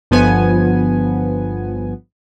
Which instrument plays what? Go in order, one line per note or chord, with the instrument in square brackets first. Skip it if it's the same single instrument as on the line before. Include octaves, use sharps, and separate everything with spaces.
[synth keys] G1 F3 B3 G#5